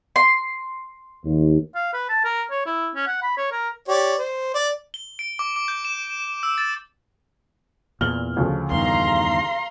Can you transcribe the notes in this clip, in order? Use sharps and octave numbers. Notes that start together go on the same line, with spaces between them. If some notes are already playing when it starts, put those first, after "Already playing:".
C6
D#2
F5
B4
A5
A#4
C#5
E4
C#4
F#5
B5
C#5
A#4
G4 C#5 D5
C5
D5
G7
D7
D6
D6
G6
E7
E6
A6
E2 A#2 F6 F#7 G7
D2 C#3 F3
E2 G2 D#3 F5 A#5 C6